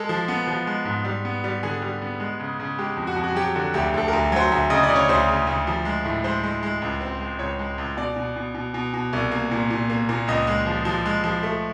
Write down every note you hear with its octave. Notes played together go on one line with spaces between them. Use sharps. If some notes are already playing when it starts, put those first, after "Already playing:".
Already playing: G#3 A4
F3
B3
F3
G#3
G#2
G3
B3
G3
D3 G#4
G3
B3
G#3
C#3
C#3
G#3 G4
F2
F#4
F2
F#4
G#4
F#3 G4
D3 F#4
D2 G4
D2 A4
D2 A#4
F#3 C5
D2
C#3 D#5
D5
C#3
C#5
D2 C5
C#3
D2
F3
G#3
A2
G#3 C5
G#3
G#3
C#2
C4
G#3
C#2 C#5
G#3
C#2
B2 D5
B2
B2
B2
B2
B2
C2
A#3
A#2
A#2
A#3
A#2
C#2 D#5
G#3
F3
F3
G#3
F3
A3